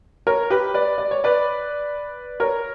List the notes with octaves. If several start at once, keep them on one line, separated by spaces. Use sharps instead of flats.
A#4 C#5
G4 B4
B4 D5
D5
C#5
B4 D5
A#4 C#5